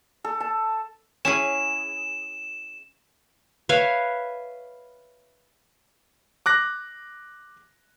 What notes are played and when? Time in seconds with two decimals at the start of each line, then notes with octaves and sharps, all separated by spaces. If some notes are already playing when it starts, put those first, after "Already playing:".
0.24 A4
0.40 A5
1.25 C#4 E4 G#4 E7
3.69 B4 C#5 E5 F5
6.46 D6 F#6 A#6